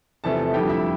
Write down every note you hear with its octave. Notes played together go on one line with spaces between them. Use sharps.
E2 C3 F3 A3 A4 A5
F2 D3 G3 G4 G5
E4 E5